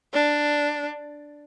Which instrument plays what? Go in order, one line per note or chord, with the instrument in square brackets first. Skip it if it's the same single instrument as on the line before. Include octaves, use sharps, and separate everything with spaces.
[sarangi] D4